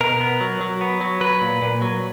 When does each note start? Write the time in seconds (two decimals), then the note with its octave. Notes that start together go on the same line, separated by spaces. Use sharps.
0.01 B2 A#4
0.20 B3
0.41 F#3
0.61 F#3
0.81 B3
1.01 F#3
1.21 F#3 B4
1.41 A#2
1.62 A#2
1.82 F#3